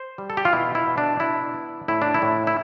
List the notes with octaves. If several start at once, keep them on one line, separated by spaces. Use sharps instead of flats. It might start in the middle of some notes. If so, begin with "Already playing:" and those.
Already playing: C5
G3
A4
G4
F4
B2 E4
E4
B2
D4
D4 E4
B3
A2 E4
D4
E4
A2
E4